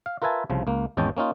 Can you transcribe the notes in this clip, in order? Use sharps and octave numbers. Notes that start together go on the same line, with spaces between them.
F5
F4 A#4 B4 E5 G#5 A5
C2 C#3 F3
C#2 A#3
G#1 E2 G#3 C#4 G5 A5
A#3 C#4 D#4 F4